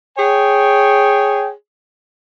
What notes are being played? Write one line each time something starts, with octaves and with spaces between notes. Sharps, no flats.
G#4 C#5 G5